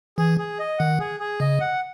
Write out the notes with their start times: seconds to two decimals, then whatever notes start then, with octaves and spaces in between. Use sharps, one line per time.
0.18 E3 G#4
0.38 G#4
0.59 D#5
0.79 D#3 F#5
1.00 G#4
1.20 G#4
1.40 C#3 D#5
1.61 F#5